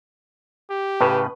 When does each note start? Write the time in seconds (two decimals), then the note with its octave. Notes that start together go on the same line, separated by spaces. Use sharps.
0.71 G4
1.00 A2 C#3 B4